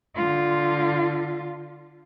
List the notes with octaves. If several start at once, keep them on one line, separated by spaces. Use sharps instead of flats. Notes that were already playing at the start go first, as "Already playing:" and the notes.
D3 F4